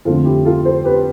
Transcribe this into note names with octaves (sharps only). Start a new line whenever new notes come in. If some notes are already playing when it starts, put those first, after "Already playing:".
F2 D3 A3 F4 A4
E4 G4
F4 A4
A4 C5
G4 B4